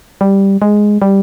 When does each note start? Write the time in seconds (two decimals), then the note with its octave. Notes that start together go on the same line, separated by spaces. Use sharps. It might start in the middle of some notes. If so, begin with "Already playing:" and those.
0.21 G3
0.62 G#3
1.02 G3